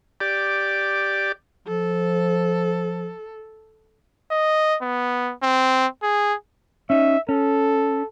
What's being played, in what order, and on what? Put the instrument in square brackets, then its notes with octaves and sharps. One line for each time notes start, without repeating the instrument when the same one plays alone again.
[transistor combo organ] G4 D5
[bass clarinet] F3 [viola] A4
[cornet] D#5
B3
C4
G#4
[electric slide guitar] C#4 D#4 [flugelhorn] E5
[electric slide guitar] C#4 [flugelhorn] A4